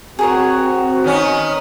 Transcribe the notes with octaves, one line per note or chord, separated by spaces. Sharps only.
C4 F#4 G#4 A#4 C#5
D#3 B3 C#4